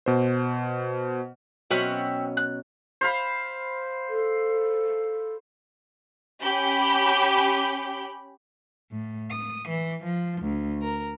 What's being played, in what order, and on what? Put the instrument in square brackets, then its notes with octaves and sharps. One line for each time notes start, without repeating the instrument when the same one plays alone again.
[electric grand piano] B2 C5
[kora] B2 F#3 C#4 [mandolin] C4 E5 F#5
[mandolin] F#6
[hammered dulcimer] C5 F5 B5
[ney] A4
[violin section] C#4 G4 B5 G6
[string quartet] A2
D#6
E3
F3
D2
A#4